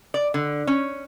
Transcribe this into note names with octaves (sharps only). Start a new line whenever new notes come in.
D5
D3
C#4